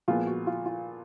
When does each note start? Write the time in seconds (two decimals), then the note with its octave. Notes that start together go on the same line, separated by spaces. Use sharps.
0.08 A#2 F3 G#3 B3 F4
0.27 F#4
0.47 F4
0.66 F4